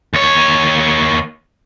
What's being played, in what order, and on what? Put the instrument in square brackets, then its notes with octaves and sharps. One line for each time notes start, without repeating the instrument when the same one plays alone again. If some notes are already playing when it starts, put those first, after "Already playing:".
[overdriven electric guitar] D#2 C#5